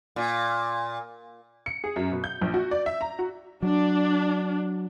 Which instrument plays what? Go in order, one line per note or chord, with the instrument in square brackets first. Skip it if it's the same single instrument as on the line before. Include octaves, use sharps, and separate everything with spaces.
[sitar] A#2
[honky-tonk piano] C#7
G#4
F#2
B2
G6
A#1
F#4
D5
E5
A#5
F#4
[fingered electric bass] F#3 [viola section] D4